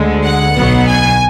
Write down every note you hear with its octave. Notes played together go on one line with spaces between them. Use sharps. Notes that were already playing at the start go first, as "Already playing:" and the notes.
Already playing: D2 D3 G#3
F#5
B1 B2 F#3 B3
G#5